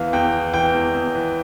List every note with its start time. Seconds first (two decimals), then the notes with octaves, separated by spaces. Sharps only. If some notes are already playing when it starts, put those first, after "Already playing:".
Already playing: E2 E3 F5
0.13 E2 G5
0.33 E3
0.54 E3 G5
0.74 E2
0.94 E2
1.14 E3